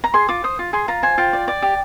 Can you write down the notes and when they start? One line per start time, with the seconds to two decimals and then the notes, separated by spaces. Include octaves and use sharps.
0.04 A#5
0.14 G#4 C6
0.28 F4 D6
0.44 C5 D#6
0.59 F4
0.73 G#4 C6
0.88 F4 A#5
1.03 C5 G#5
1.18 F4 G5
1.33 D5
1.48 D5
1.62 G4